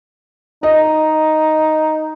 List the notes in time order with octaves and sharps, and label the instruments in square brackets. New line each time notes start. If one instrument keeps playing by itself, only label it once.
[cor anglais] D#4 [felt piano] D#5